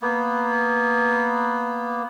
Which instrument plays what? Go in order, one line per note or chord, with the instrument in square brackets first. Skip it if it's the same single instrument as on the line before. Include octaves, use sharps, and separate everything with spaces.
[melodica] A#3 B3